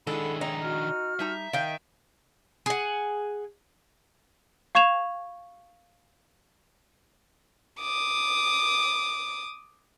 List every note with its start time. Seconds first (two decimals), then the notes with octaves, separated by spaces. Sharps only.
0.07 D#3 G#3 D4 E4 A4 F#5 B5
0.41 D#4 C#5 G5 A#5
0.62 F#4 F6
1.19 G3 D#4 E5 A#5
1.53 D#3 F5 G5
2.66 G#4 F#5
4.75 F5 C#6 G#6 E7 F7
7.81 D6 D#6